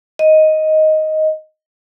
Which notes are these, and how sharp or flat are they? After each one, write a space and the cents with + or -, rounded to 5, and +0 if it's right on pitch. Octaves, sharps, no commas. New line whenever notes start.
D#5 +5